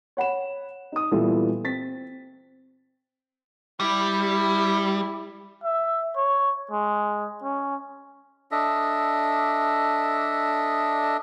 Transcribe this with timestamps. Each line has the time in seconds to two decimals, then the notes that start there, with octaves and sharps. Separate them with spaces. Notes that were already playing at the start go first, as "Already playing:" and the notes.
0.17 C#5 F#5 B5 E7
0.92 D#4 D#6
1.11 A#2 E3 G3 B3 F4 A4
1.64 C4 A6 B6
3.80 G3 E4
5.64 E5
6.16 C#5
6.71 G#3
7.43 C#4
8.51 D4 A4 D#5 E5